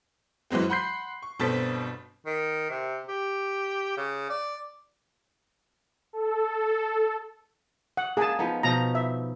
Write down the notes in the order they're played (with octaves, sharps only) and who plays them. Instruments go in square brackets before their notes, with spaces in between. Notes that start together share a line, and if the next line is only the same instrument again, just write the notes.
[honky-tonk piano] F#2 E3 F#3 G#3 C4
F#5 B5 C6 G6 C7
C#6
G1 B2 C4 A4 A6 B6
[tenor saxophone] D#3
C3
G4
C#3
D5
[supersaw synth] A4
[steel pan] F#5
[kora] A#3 D4 [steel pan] G#4 A5
[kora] F3 B3 D#4
[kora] B2 F3 D#4 [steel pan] A#5
[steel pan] E5